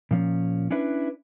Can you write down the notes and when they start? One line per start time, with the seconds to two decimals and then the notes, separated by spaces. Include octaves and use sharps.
0.11 A#2 F3 C#4
0.71 C#4 D4 E4 B4